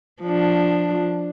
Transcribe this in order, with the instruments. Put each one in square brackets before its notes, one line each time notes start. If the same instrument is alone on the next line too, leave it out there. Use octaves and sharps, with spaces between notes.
[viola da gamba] F3 D4